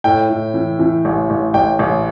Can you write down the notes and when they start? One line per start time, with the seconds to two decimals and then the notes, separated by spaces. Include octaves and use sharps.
0.04 A2 G5
0.29 A2
0.54 E3
0.79 E3
1.05 A1
1.30 A1
1.54 A1 G5
1.79 A1